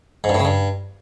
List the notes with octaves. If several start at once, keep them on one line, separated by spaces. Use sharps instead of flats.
G#2
G2
A2
C#3
G2